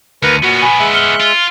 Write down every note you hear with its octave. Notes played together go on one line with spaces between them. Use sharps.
D2 A#4 B4 A#5 C#7 D#7
A#2 B3 C#4 F#4
G#5 B5
G#3 E5 F#6
F6 C#7 G7
F4